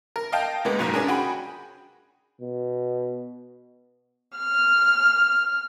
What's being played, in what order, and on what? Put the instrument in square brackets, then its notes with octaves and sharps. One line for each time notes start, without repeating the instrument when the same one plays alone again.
[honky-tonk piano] A#4
D#5 F5 G5 A5 G6
D2 G#3 A#3 B3
F#1 B1 G#2 B2
C#4 D4 G#4 A#4
F#4 G#4 G5 B5
[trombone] B2
[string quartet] F6